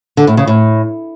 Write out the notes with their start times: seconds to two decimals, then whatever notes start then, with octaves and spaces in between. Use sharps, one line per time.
0.17 D3
0.27 A2
0.37 C#3
0.47 A2